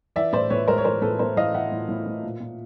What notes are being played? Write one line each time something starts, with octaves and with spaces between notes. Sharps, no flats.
E3 D5 E5
A2 C5 D5
A2 B4 C#5
G#3 A#4 C5
C#5
E3 A#4 C5
A2 A4 B4
A2 A#4 C5
E3 D#5 F5
E3 E5 F#5
A2
A2
A2
A#2
A#2